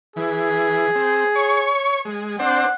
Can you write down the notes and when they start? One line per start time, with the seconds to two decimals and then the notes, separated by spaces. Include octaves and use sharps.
0.16 E3 G#4
0.95 C4
1.35 C#5 C#6
2.05 G#3
2.39 C4 D4 C5 F#5